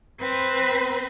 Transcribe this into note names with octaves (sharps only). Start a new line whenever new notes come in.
C4 B4